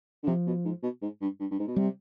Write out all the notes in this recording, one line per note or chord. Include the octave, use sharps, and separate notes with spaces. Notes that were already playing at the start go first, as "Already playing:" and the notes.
D3
C3 F3
B2
G#2
B2
G#2
G2
G2
G2
G#2
B2
C3 G3